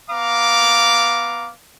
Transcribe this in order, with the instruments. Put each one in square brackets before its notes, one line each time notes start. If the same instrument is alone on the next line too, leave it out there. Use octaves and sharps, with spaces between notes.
[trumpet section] B3 F5 A#5 D6